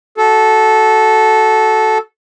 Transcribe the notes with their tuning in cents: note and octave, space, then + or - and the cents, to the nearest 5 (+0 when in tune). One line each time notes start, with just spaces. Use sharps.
F#4 +10 A4 -10